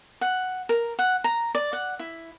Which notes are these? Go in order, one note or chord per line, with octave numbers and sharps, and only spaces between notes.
F#5
A#4
F#5
A#5
D5
F#5
E4